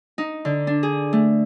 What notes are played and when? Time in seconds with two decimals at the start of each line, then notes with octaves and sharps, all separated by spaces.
0.18 D#4
0.45 D3
0.67 D4
0.83 G#4
1.13 A3